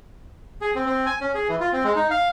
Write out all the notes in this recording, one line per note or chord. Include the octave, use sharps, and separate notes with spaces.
G#4
C4
C4
G#5
C#4
G#4
E3
F4
C4
G#3
D#4
F5